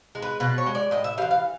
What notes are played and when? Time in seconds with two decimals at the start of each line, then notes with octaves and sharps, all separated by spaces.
0.15 G#3
0.22 B4
0.40 B2 B4
0.58 C#5
0.66 G#3
0.75 D5
0.91 A2 D#5
1.04 E5
1.18 G3 F5
1.22 E3
1.31 F5